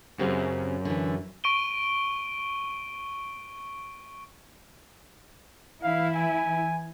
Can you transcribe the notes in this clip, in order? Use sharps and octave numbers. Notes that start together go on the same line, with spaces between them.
F#2 C#3 C4 G4
D3 E3
C#6 D7 D#7 G7
E3 E4 F5
G#5